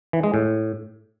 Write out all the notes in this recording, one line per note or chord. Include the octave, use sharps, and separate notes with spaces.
E3
G#3
A2